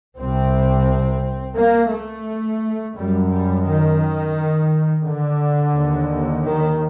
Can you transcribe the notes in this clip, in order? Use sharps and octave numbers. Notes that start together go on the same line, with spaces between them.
C2 C3 C4
A#3
A3
F#2 G3
G3
D#3
D3
D#2
D#3